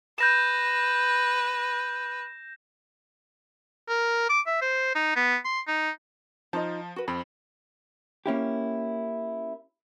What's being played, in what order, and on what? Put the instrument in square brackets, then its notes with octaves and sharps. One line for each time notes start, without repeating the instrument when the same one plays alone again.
[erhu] B4 [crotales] G6 A#6 E7
[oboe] A#4
D6
E5
C5
D#4
B3
C6
D#4
[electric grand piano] F3 A5 [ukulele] D#4 F4 D#5
[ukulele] F#4 B4
[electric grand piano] F2 C4 [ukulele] B5
[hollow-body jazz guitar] A#3 C#4 E4 G4